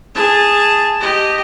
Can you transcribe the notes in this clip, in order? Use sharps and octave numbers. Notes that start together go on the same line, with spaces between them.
G#4 A5
G4 D#5